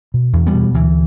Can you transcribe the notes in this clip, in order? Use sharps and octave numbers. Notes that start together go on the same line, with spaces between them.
B2
E2
G3 B3
B2
D2 E3